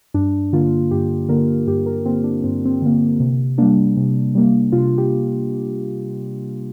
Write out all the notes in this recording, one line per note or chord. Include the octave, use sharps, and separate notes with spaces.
G2 D4
D3 A#3 F4
G2 G4
D3 A#3 A#4
G2 G4
A#4
D3 A#3 C4
D4
G2 C4
C4
D3 A#3
C3
G3 A#3 D4
C3
G3 A#3
C3 F4
G4